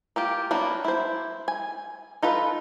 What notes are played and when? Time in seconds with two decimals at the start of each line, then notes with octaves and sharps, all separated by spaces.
0.16 A#3 F4 G4
0.51 F#3 A#3 B3 D4
0.85 E4 C5
1.48 G#5
2.23 D#4 F4 A4 B4